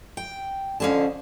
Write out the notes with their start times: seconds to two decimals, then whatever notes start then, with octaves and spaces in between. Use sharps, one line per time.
0.17 G5
0.80 F2 D3 F3 C#4 G#4 A5